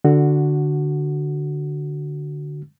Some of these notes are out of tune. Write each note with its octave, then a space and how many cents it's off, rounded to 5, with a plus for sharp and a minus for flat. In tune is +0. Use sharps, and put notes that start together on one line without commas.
D3 +0 F#4 +0